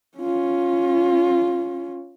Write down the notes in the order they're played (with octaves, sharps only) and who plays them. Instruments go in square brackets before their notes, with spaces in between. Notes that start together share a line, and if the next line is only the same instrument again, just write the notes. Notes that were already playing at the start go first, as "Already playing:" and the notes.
[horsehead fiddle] C#4 F4